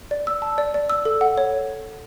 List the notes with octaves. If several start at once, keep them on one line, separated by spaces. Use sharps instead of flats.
D5
E6
A5
D5
D5
E6
A4
F#5
C#5